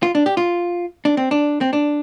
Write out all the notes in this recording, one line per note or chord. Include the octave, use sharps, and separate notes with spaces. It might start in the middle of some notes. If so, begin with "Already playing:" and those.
F4
D4
G4
F4
D4
C4
D4
C4
D4